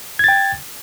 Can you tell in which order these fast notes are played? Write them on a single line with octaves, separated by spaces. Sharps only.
G#6 A6 G5